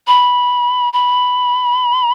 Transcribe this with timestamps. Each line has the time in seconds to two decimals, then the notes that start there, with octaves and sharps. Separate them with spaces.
0.07 B5
0.93 B5